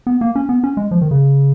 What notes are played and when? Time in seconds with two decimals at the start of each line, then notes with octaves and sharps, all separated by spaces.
0.07 B3
0.21 A#3
0.35 C#4
0.49 B3
0.64 C#4
0.77 G#3
0.91 F3
1.01 D#3
1.11 C#3